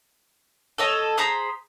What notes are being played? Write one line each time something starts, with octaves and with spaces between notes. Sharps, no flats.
A4 C#5 D#5
G#4 C5 A#5 B5